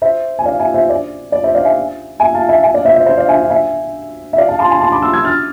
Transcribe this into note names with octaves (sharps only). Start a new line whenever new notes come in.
C5 E5
G#5
D5 F5
E5 G#5
C5 E5
D5
D5
C5 E5
D5 F5
E5 G#5
E5 G#5
F5 A5
E5 G#5
E5 G#5
D5 F5
C5 E5
C5 E5
C5 E5
D5 F5
E5 G#5
F5
E5 G#5
E5
D5 F5
F5 A5
A5 C6
G#5 B5
A5 C6
B5 D6
C6 E6
E6 G#6
F6 A6